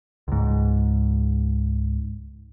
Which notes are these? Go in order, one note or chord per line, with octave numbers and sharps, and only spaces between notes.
C#2 G#2